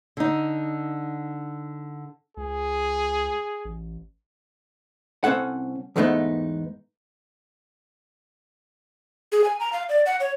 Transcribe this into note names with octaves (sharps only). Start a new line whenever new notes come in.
D3 D#4
C#2 G#4
A1
C2 C4 C#4 A4 F#5
E2 G#2 G#3 A3 B3 D#4
G#4
G#5
A#5
F5
D5
F#5
C#5